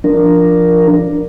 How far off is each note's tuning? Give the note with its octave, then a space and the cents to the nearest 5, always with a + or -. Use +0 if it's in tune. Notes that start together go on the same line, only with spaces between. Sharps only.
F3 -10 D4 +0 A#4 +0